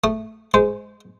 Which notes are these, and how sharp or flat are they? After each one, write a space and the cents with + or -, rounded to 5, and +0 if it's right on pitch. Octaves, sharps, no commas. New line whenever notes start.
A3 +0 D#6 -20
G#3 +0 C5 -20